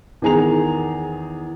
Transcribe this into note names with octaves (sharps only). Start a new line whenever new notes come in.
E2 D#3 G#4 A#5 F7